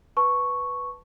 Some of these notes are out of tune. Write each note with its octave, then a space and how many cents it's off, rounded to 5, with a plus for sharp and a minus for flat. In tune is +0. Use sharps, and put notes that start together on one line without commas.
B4 +0 A5 +0 C#6 +0